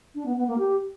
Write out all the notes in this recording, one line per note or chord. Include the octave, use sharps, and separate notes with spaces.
D4
B3
B3
A#3
G4